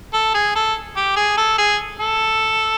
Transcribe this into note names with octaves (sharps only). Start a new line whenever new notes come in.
A4
G#4
A4
G4
G#4
A4
G#4
A4